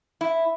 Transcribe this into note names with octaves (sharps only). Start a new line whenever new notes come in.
E4